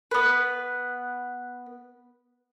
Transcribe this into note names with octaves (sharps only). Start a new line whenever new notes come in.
B3 B4